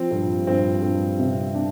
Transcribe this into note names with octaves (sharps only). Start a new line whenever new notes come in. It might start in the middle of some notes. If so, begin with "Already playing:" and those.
Already playing: F3 C4
G2
G2 C4
G2
C3
D4